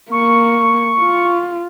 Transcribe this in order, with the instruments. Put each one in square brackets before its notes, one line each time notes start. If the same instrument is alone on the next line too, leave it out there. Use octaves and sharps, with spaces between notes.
[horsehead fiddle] A#3 [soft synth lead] C#6
[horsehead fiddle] F4